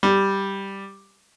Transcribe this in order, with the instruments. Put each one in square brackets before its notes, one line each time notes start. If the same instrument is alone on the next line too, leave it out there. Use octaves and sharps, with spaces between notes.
[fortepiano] G3